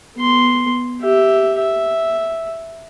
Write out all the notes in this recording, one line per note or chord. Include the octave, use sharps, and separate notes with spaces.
B3 C6
G4 E5
E5